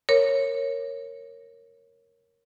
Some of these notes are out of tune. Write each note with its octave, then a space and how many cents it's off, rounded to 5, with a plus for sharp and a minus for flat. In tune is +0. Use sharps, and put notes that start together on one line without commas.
A#4 +0 C#5 -10